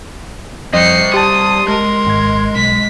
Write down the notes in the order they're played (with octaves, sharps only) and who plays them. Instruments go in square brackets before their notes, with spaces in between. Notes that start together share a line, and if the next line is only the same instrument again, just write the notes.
[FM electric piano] F2 [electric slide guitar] G3 C5 G5 [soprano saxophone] D#5 [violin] C7 C#7
[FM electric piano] G4 A5 [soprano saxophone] C6 [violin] D#6
[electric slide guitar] G#3 [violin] A#4
[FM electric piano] G#1 G#6
[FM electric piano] B1 [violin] B6